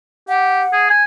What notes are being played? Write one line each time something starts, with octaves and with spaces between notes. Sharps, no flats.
G4 F#5
G#4
G#5